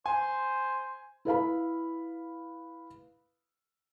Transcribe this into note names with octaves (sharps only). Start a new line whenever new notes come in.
C5 G#5
E4 B4 F5 B5